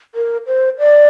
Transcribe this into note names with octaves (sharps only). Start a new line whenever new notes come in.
A#4
C5
D5